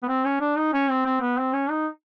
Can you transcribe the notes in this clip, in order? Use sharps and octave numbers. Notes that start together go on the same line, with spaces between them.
B3
C4
C#4
D4
D#4
C#4
C4
C4
B3
C4
C#4
D#4